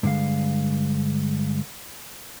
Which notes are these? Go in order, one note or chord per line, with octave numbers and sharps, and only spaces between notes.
G2 D3 G#3 F5